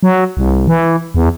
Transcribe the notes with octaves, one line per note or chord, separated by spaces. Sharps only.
F#3
C2
E3
E2